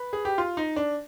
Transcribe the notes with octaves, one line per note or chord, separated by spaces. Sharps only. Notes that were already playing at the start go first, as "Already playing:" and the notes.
Already playing: B4
G#4
G4
F4
D#4
D4